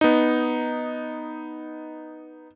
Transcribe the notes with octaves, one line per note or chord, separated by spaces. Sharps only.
B3 D#4